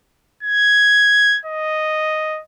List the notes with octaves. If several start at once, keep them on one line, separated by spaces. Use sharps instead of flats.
G#6
D#5